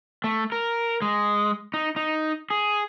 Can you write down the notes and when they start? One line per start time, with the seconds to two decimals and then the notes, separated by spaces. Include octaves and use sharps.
0.24 A3
0.52 A#4
1.02 G#3
1.74 D#4
1.96 D#4
2.50 G#4